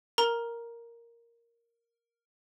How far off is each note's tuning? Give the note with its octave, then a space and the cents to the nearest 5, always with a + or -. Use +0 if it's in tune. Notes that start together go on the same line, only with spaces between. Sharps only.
A#4 +0 A#5 +10